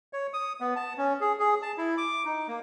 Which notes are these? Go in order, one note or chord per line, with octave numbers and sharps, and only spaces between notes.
C#5
D#6
B3
A5
C#4
G#4
G#4
A5
E4
D6
D#4
A#3